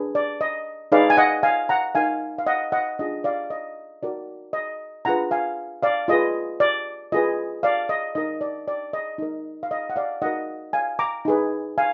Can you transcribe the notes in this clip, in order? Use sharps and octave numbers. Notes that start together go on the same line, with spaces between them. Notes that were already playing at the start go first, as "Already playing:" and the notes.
Already playing: D4 G#4 B4
D5
D#5
D#4 G#4 B4 D5 F5
G#5
D#5 F#5
F5 G#5
F#5 A#5
D#4 A#4 F5 G#5
F5
D#5 F#5
D#5 F#5
D4 F4 G#4 D#5
D5 F5
D#5
D#4 F#4 A#4 D5
D#5
D4 F4 G#4 B4 F#5 A#5
F5 G#5
D5 F5
F4 G#4 B4 D#5
D5
F4 G#4 B4 D#5
D5 F5
D#5
D#4 A#4 D#5
D5
D5
D#5
D#4 A#4
F5
D#5
F#5
D5 F5
D#4 F#4 A#4 D#5 F#5
F5 G#5
A#5 D6
D#4 G#4 B4
F5 G#5